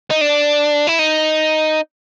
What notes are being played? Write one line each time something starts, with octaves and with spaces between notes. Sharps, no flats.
D#4
D4
E4
D#4